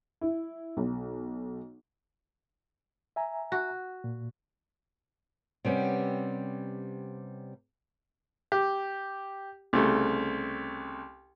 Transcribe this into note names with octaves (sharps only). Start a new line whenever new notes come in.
E4
B1
E5 G#5 A#5
F#4
A#2
C3 G3 B3 C#4
G4
C2 C#3 A3